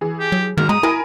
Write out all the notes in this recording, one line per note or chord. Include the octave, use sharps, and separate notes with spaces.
E3 G#4
G4
F#3
G1 G#2 B2 D#3 A#4
G#3 A#5 D#6
E4 A#4 G#5 B5